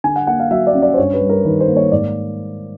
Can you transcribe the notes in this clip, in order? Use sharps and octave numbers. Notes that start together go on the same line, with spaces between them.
D3 G#5
F#5
A#3 F#5
F5
F#3 E5
D5
C#4
D5
C5
G2 C#5
B4
G3
A#4
D#3 B4
C5
A#3
C#5
G#2 D5